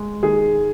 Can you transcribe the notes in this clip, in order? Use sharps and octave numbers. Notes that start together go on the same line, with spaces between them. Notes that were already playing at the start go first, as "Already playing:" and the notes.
Already playing: G#3
D#3 G#4